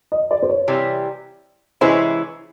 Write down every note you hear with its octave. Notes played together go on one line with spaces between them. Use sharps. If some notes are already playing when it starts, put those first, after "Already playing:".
D#5
D5
C5
C#5
C3 E3 G3
C3 E3 G#3 C#4 E4 C5